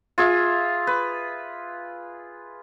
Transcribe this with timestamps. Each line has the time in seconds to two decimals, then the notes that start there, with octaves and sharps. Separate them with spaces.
0.18 F4 G#4 E5
0.87 B4